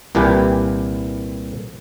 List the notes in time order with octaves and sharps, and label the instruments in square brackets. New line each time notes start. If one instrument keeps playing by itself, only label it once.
[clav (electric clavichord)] C2 A#2 E3 G4 B4 G#5